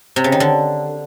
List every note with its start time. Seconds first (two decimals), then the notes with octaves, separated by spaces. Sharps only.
0.16 C3
0.24 C#3
0.32 D#3
0.40 D3